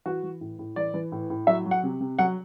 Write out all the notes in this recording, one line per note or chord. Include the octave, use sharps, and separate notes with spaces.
E3 F#4
E3
A2
A2
E3 D5
E3
A2
A2
F#3 E5
F#3
F#5
C3
C3
F#3 F#5